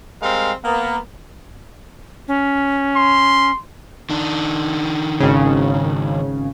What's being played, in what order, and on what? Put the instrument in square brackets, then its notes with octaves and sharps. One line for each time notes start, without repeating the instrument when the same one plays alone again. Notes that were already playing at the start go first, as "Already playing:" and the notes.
[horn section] G3 G#3 C4 A#4 F5
A#3 B3
[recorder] C#4
[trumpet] C6
[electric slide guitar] D#3 D4
[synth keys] G#1 C#3